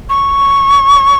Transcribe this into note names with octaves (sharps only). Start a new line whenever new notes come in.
C#6